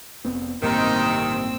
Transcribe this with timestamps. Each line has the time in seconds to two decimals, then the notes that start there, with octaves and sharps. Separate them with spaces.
0.25 F1 B3 C4
0.62 A1 G2 C3 D#3 A#3 C4 D#4 E6